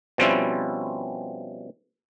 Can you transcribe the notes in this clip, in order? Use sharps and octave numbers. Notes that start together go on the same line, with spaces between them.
B2 F3 G3 C4 C#4 E4